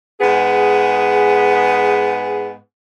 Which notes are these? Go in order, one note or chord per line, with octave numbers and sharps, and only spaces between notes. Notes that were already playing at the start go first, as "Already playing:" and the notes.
G#2 B3 G#4